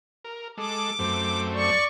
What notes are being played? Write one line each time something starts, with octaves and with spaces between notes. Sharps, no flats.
A#4
G#3 A4 D6
F#2 A3 C4
D5 C#6